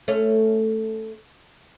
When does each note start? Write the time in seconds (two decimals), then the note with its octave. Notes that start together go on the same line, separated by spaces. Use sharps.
0.08 A3 C#4